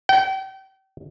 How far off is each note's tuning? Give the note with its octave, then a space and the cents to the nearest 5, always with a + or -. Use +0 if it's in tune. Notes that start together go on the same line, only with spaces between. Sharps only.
G5 -35